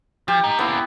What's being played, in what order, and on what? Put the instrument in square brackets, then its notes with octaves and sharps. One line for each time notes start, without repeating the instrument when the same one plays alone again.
[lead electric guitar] F3 [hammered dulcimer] G4
[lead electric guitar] G#2 D#4
[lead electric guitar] A#3 C#4 [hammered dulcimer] B3 E4